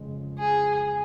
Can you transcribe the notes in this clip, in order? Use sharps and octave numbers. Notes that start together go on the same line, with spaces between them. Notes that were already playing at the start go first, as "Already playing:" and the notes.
Already playing: F2 C#3 G#3
G#4